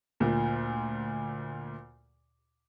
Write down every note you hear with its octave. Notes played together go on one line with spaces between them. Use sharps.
D2 A#2